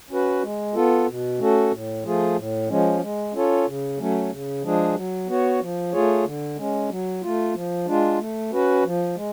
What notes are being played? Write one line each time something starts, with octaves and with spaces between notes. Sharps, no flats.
C#4 F#4 B4
G#3
B3 F4 A4
B2
A3 C#4 F#4 A4
A2
F3 A3 F4 G#4
A2
F3 G#3 C#4
G#3
C#4 F4 A4 C#5
C#3
F#3 A3 C#4
C#3
F3 G#3 D4 G#4
F#3
B3 F#4 C#5
F3
A3 F4 G#4 C#5
D3
G#3 C#4
F#3
A3 F4
F3
G#3 D4 F4
A3
C#4 F#4 B4
F3
G#3